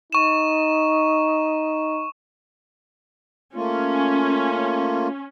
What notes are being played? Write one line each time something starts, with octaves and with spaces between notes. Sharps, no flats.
D#4 C#6 E7
A3 A#3 C#4 F4